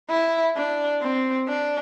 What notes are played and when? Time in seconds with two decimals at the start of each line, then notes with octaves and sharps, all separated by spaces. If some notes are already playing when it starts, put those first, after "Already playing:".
0.10 E4
0.57 D4
1.02 C4
1.48 D4